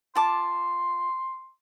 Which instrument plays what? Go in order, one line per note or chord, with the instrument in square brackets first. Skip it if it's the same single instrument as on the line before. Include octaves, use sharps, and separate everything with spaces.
[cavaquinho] F4 A5 D6 [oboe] C6